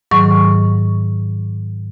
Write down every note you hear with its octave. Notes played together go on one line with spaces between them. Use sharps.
G#2 D#3 F#3 C#6